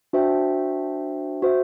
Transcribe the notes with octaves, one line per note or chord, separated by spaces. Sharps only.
D4 F#4 C5 E5 G5
F#4 C5 E5